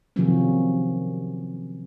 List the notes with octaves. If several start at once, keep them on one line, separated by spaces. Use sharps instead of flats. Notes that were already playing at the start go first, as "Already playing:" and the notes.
C3 D#3 F3 F#3 A#3 C#4